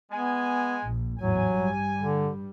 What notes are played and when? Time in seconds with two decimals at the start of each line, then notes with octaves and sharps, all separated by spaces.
0.12 G#3 B3 G#5
0.83 A#1
1.18 A1 E2 G#2 F#3 G#5
1.49 G2 G3
1.99 D3